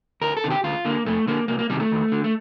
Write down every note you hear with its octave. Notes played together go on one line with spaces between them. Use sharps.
D2 A#4
A4
C3 D#3
G4
D2 F4
D3 A#3
F2 A3
D3 A#3
C2 A#3
A#3
C3 D#3 G3
A3
D#2
D3
A3